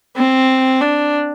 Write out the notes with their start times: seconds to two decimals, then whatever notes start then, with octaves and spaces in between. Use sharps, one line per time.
0.16 C4
0.81 D4